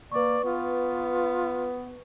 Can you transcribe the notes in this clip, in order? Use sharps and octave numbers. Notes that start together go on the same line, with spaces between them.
A#3 B4 D5 C#6
B3 F4